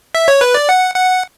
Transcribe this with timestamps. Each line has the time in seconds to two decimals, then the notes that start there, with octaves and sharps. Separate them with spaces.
0.15 E5
0.28 C#5
0.41 B4
0.54 D5
0.69 F#5
0.95 F#5